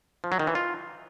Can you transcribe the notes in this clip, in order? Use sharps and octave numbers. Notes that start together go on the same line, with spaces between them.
F3
F#3
D#3
E3
F4